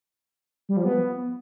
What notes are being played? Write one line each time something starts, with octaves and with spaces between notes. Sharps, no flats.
G3
F3
B3